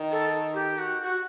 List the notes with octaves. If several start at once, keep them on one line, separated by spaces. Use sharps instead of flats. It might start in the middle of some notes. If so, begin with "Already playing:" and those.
Already playing: D#3
A4
G4
F#4
F#4